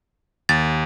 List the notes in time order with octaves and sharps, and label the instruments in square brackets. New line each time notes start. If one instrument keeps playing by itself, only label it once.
[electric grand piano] D#2 [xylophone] A6